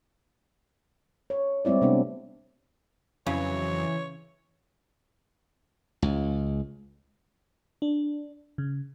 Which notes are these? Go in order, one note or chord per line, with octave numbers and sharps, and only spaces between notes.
C#5
G3 G#3 C4 E4 D5
C3 A3 B3 D4 G4
F2 C#3 E3 F#3 C#5
C#2
D4
C#3